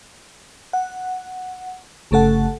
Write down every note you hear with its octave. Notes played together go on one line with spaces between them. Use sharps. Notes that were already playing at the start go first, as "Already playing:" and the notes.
F#5
G1 C#3 A3 A4 F#5 A5